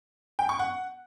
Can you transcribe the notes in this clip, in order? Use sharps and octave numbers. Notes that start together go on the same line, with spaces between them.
G5
C#6
F#5